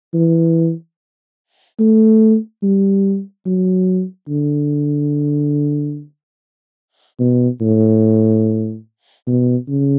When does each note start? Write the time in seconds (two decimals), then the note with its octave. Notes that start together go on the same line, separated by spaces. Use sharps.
0.14 E3
1.79 A3
2.63 G3
3.46 F#3
4.29 D3
7.19 B2
7.61 A2
9.27 B2
9.68 C#3